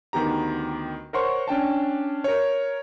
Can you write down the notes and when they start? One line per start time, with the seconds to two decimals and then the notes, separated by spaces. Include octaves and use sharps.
0.13 D2 D#3 B3 G4 A#5
1.13 A#4 C5 C#5 F#5 C6 C#6
1.48 C#4 D4 G5 A5
2.24 A#4 C#5